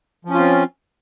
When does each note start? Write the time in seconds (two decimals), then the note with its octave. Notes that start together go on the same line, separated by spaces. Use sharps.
0.25 F3
0.29 C#4
0.34 F4
0.39 C4